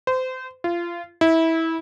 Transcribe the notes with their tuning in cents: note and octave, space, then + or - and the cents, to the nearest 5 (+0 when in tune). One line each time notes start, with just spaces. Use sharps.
C5 -25
F4 -25
E4 -20